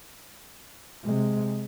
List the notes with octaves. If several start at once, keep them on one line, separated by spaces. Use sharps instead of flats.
C3 G#3